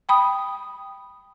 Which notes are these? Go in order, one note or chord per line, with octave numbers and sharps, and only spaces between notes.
G5 B5 D#6